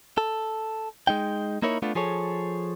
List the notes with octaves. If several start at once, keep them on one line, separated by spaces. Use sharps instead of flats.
A4
G#3 D#4 G5
A#3 D#4 E4 A#4 C#5
A3 B3 D4 F4
F3 G#4 A4 C#5